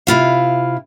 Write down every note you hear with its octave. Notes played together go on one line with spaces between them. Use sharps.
C3 E4 F4 F5